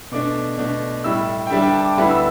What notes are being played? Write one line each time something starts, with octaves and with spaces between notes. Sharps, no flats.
B2 A3 D4 D6
B2 A3 D4
A2 G3 E4 E6
G5
D3 G3 D4 E5
G5
A5
D6
D2 D3 G3 B3 E4 B5
E6